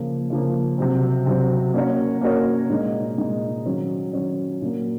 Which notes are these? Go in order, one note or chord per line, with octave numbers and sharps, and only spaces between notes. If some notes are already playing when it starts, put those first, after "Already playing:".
Already playing: C#3 F3 A#3
C#3 F3 A#3
C3 F#3 C4
C3 F#3 C4
A#3 C#4 F#4 A#4 C#5
A#3 C#4 F#4 A#4 C#5
A#2 G#3 D#4
A#2 G#3 D#4
D#3 F#3 C#4
D#3 F#3 C#4
A#2 F#3 A#3